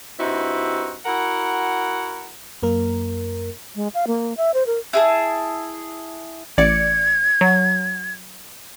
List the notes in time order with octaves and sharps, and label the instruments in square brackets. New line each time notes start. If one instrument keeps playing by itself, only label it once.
[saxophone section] G2 C4 D#4 E4 F#4
E4 F#4 A#4 F#5
[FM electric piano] F#2 A#3 A#4
[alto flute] G#3
F5
A#3
E5
C5
A#4
[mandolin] E4 G#4 A5
[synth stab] A1 D5 C#7 [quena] G#6
[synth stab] F#3